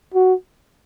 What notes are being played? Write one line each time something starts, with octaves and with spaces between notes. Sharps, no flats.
F#4